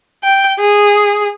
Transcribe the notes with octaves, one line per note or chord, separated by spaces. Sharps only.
G5
G#4